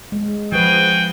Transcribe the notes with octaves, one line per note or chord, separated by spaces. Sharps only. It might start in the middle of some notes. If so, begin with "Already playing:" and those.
G#3
F3 F#4 G#4 B4 G5